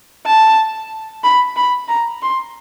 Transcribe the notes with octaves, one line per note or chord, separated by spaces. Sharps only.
A5
B5
B5
A#5
C6